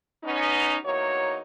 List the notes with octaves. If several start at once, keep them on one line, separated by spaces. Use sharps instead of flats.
B3 C#4 D#4
E2 A#3 D#4 F#4 C#5